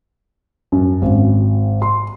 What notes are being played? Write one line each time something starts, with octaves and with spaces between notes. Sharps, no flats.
F#2
G#1
C6